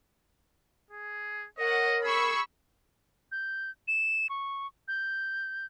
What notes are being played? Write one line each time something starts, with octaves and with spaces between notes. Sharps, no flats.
G#4
A#4 C#5 D#5 F#5
G#4 B5 C#6 E6
G6
E7
C#6
G6